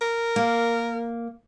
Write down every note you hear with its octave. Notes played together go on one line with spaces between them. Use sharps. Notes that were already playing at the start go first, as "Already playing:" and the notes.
A#4
A#3